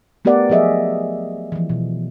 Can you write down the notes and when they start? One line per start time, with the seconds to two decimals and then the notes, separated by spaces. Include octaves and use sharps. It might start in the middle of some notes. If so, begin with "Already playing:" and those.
0.25 A3 B3 G4 A#4 D5 F#5
0.50 F3 F#3 G#4 D#5 E5
1.52 E3 F3
1.70 B2